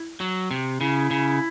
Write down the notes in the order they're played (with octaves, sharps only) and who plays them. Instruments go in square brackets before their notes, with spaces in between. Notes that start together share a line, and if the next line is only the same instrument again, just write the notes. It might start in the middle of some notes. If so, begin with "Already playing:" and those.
Already playing: [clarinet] E4
[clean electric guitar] F#3
C3
[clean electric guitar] C#3 [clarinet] E4
[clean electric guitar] C#3